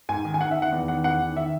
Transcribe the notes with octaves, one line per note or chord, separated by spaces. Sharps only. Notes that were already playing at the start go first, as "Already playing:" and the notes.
G#2 G#5
D#3
G#5
D#3 F#5
E5
D#3
F#5
E2
D#3 F#5
E2 F#5
D#3
D#3 E5